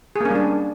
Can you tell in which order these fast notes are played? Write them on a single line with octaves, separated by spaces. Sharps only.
G#4 A#3 C#4 G3 D4